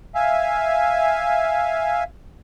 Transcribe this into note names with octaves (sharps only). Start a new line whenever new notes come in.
E5 F5 G#5